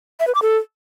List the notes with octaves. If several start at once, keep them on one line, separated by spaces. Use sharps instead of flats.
E5
B4
D6
A4